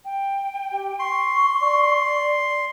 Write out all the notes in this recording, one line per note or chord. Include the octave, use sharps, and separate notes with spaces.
G5
G4
C6 C#6
D5